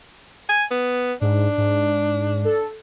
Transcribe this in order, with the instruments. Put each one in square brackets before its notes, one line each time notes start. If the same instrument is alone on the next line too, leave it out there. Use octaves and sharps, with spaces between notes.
[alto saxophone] G#5
B3
[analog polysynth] G#2 [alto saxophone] D4
[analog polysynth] G#2
A4